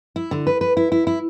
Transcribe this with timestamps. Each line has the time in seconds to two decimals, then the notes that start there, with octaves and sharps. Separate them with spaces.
0.16 E4
0.31 D3
0.47 B4
0.61 B4
0.77 E4
0.92 E4
1.07 E4